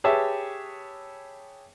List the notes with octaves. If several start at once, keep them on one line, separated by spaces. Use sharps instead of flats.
G4 G#4 B4 C#5 E5 A5